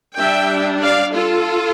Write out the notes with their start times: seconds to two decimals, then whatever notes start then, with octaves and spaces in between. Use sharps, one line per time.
0.17 G3 D4 E5 G5
0.81 D5 F5
1.14 F4 A4